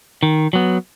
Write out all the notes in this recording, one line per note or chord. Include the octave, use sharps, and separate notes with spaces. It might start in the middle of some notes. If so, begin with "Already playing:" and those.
D#3
F#3 B3